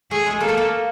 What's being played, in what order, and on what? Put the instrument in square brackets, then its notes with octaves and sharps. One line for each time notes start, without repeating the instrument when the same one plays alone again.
[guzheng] A3 [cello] G#4
[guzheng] G#3
[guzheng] A#3 [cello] A4
[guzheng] A3
A#3